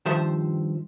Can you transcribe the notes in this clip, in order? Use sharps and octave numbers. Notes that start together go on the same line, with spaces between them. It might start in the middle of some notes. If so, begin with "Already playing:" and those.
G2 D#3 F3 G4 C5 E5